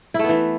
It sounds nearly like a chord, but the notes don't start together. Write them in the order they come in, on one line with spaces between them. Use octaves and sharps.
E4 A3 B3 E3